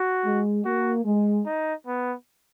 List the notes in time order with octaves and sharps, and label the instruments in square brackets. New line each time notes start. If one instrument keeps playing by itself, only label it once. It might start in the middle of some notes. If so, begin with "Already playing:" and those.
Already playing: [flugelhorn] F#4
[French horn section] G#3
[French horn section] A#3 [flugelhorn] F#4
[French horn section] G#3
[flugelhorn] D#4
B3